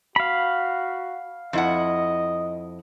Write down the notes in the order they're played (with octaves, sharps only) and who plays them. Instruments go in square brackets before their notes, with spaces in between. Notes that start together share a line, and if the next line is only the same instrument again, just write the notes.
[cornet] F#4 [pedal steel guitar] F5 B5
[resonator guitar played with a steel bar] F2 E4 F#5 [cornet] D#5